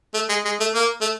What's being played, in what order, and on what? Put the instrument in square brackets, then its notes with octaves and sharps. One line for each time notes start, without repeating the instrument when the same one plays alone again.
[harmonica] A3
G#3
G#3
A3
A#3
A3